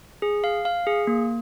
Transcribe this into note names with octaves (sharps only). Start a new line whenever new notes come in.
G#4
F5
F5
G#4
A#3